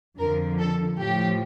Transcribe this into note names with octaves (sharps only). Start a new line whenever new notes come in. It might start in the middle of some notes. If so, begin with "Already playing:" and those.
F2 D3 F3 A#4
A4
A2 F3 G4